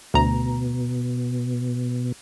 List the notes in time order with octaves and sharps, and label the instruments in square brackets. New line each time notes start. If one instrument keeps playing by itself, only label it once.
[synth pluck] D2 A#5 [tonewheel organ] B2